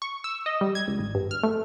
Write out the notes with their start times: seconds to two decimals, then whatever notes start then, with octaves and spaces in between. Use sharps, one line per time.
0.02 C#6
0.24 E6
0.46 D#5
0.61 G3
0.75 G#6
0.88 C#2
0.99 G#1
1.15 G2
1.31 F6
1.43 A3